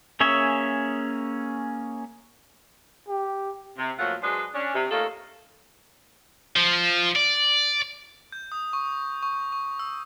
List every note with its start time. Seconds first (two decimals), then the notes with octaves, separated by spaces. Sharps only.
0.20 A#3 C#4 G#4 C#5 E5
3.09 G4
3.78 C3
3.98 A#2 F3 F#3 A3 F4 F#5
4.22 F#3 G#3 D4 G#4 B4 C5
4.54 C#4 D4
4.75 C3
4.91 A3 A#3 C#4 D#4 F4 A4
6.56 F3
7.16 D5
8.32 G6
8.52 D#6
8.73 C#6
9.23 C#6
9.52 C#6
9.79 E6